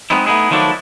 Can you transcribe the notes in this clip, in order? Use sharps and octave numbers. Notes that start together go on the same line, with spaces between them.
G#3 B3 C4 D#4 E4
A3 B3 D#4 E4 G#4
D#3 F3 F#3 A3 D4 E4